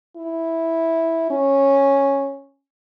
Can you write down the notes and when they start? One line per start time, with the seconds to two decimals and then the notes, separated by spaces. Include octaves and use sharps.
0.17 E4
1.30 C#4